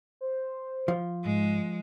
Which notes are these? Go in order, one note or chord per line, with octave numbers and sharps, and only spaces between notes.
C5
F3
G#2 G#3